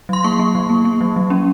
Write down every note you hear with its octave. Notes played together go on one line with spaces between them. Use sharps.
F#3 C6
A#3 C#6
A#3
F#3
A#3
A#3
F#3
F#3
C#4